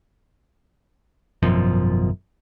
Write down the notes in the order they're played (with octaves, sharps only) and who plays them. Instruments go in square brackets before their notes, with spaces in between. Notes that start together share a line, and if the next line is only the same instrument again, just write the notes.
[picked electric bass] G#1 F#2 B2 F3